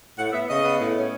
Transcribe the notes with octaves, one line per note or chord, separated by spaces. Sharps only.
A2 F#5
B3 E5
C#3 D#5
B3
A2
C#4